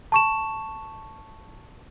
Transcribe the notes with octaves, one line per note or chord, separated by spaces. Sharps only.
A5 C#6 E7